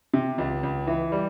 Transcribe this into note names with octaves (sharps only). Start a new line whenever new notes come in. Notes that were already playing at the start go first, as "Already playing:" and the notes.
C3
C#2
C#2
E3
G3